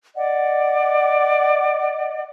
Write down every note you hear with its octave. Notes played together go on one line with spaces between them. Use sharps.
D5 D#5 F#5